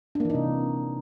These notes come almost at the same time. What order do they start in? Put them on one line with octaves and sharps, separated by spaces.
D4 A#3 E3 D#4 C3